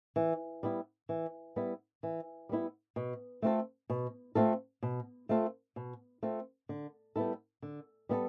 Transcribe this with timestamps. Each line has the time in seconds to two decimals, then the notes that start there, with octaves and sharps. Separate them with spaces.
0.16 E3
0.63 G3 B3 E4
1.09 E3
1.56 G3 B3 E4
2.03 E3
2.49 G3 B3 E4
2.96 B2
3.42 A3 C4 F4 A4
3.90 B2
4.35 A3 C4 F4 A4
4.83 B2
5.29 A3 C4 F4 A4
5.76 B2
6.23 A3 C4 F4 A4
6.69 D3
7.16 G3 B3 E4 A4
7.62 D3
8.09 G3 B3 E4 A4